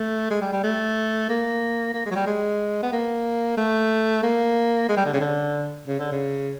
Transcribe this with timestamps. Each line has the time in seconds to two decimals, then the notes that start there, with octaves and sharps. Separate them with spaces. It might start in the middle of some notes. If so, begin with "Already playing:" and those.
Already playing: A3
0.31 G#3
0.41 G3
0.53 G3
0.63 A3
1.29 A#3
1.94 A#3
2.06 G#3
2.11 F#3
2.15 G3
2.26 G#3
2.83 B3
2.93 A#3
3.57 A3
4.23 A#3
4.89 G#3
4.97 G3
5.05 D3
5.13 C#3
5.21 D3
5.87 C#3
5.99 D3
6.12 C#3